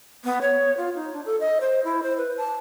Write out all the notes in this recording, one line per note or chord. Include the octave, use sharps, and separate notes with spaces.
B3
C#5
F4
D#4
D4
A4
D#5
C5
E4
C5
B4
A5